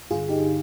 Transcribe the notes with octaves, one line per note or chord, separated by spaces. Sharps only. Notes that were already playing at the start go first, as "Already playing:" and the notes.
G2 D3 F4 G#4
D#4 G4